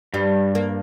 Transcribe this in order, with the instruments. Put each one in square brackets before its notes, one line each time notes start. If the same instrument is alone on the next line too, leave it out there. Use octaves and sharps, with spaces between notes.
[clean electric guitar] G2 [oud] G3
[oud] A#3